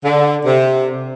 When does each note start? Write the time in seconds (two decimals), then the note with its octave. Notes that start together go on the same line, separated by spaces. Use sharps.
0.05 D3
0.46 C3